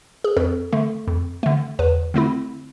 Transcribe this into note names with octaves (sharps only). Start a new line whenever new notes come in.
G#4
F2 A4
D3 A3
F2
D3 A3
E2 B4
D3 A3 C4 E4